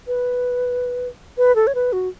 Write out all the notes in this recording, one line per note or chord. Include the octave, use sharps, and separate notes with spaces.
B4
B4
A4
C#5
B4
F#4